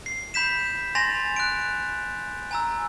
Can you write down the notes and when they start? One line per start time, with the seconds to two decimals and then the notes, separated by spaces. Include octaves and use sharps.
0.06 C7
0.34 B5 G6 B6 E7
0.95 G#5 C6 A6 A#6 F7
1.36 F#6 D7
2.51 G#5 A#5 E6